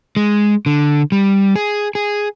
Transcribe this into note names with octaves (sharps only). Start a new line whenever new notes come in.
G#3
D3
G3
G#4
G#4